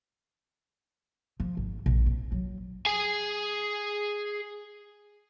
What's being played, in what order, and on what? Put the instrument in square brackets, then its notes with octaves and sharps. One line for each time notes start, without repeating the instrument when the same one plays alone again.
[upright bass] F3
G#1
A#1
C4
F#3
[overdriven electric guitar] G#4 G#5